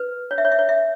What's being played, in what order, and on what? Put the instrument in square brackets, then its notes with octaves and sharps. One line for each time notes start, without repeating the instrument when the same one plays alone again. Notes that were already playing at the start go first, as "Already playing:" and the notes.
Already playing: [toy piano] B4
C#5
E5
C#5
E5
C#5
E5